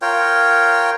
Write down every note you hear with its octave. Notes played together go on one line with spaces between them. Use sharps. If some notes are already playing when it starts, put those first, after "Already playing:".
F4 A#4 C#5 G5